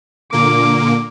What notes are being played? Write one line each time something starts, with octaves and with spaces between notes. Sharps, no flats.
A#2 D3 A#3 D6